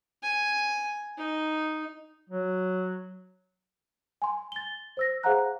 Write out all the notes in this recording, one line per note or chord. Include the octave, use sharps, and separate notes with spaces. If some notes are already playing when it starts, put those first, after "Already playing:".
G#5
D#4
F#3
G#5 C6
A6 G7
C5 E6 A#6
G#4 C5 F5 F#5 A#5 F#6